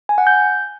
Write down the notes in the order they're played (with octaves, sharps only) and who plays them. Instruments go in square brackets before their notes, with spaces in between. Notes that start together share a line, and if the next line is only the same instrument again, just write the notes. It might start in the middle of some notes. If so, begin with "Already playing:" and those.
[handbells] G#5
F#5
G6